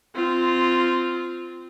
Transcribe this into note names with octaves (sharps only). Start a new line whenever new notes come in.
C4 F4